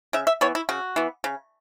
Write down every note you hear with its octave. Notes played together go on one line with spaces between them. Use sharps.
C#3 E5
E5
E3 B3 C#5
E4
C#3 F#4
E3 B3
C#3